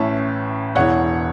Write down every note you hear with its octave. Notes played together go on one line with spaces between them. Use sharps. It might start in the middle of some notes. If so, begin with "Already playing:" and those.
Already playing: A1 A2 E3 C#4 E5 A5
E1 E2 E3 C#5 F#5